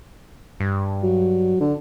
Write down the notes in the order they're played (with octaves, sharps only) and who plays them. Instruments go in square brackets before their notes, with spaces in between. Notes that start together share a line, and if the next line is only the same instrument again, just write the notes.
[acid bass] G2
[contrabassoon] F#3
D3